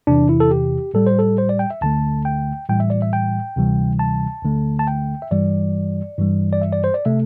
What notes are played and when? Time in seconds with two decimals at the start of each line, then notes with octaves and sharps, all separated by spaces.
0.07 E2 C3 E3 D4
0.29 E4
0.40 A4
0.51 G4
0.94 A2 G3 A4
1.07 C5
1.19 A4
1.38 C5
1.49 D5
1.59 G5
1.70 E5
1.81 D2 D3 A3 A5
2.25 G5
2.69 A2 E3 G3 G5
2.80 E5
2.90 D5
3.02 E5
3.13 G5
3.56 D2 C3 E3 G3
3.99 A5
4.43 D2 D3 A3
4.79 A5
4.87 G5
5.22 E5
5.31 G2 E3 G3 D5
6.18 G2 E3 G3
6.53 D5
6.62 E5
6.73 D5
6.84 C5
6.94 D5
7.05 C3 A3 E5